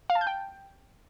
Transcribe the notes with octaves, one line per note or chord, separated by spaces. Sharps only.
F5
A5
G6
G5